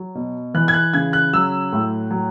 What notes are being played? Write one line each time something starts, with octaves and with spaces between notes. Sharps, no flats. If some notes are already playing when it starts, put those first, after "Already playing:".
Already playing: F#3
B2
E3 F#6
G#6
F#6
C#3 G#6
F#6
F#3 E6
A2
F#3